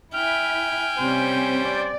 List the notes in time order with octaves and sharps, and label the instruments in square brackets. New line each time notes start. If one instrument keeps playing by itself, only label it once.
[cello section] E4 [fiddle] G5 G#5 [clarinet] F6
[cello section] C3 C4 [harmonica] G3 C#4 C5
[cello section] D5